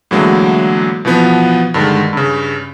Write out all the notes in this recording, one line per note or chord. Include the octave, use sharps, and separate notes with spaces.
A2 D3 E3 F#3 G#3 A#3
B2 E3 F3 B3
G2 D3 D#3 G#3
G2 C#3